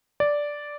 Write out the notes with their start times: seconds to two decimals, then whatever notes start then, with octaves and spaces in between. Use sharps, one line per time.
0.20 D5